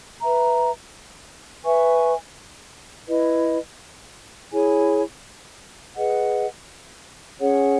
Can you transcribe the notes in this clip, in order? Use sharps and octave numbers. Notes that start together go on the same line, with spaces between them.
B4 E5 A#5
B4 E5 G#5 C#6
E4 B4 D#5
E4 G#4 C#5 G#5
G#4 B4 D#5 F#5
C#4 G#4 C#5 F#5